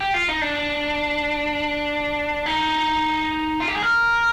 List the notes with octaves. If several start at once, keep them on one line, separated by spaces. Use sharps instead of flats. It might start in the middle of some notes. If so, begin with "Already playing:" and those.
G4
F4
D#4
D4
D#4
F4
G4
G#4
A#4